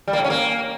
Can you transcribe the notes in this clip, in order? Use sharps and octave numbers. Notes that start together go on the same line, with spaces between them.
G3
A#3
A2
C#4
A#3